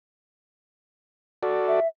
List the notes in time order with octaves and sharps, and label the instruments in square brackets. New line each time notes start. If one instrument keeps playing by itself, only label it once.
[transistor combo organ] F#4 A4 D5
[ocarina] E5